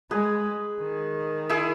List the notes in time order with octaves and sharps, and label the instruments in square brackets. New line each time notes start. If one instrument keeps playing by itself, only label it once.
[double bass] G#3 [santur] G#4 B4
[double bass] D#3
[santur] E4 G#4